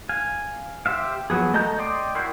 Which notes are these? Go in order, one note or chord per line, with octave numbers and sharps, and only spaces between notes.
F5 G#5
G4 C5 E5 F5
F3 F#3 B3 G#4
A3 D#5 A5 A#5 G6
D5 D#5 G5 C6 D6
E4 F#4 A#4 G5 C6